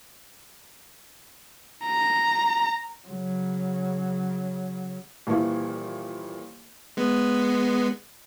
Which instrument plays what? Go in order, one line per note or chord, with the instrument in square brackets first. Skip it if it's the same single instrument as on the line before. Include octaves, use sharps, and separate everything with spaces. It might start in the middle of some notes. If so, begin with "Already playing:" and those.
[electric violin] A#5
[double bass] C#3 F#3
[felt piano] D#1 A#2 E3 E4 F5 C#6
[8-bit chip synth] G#3 B3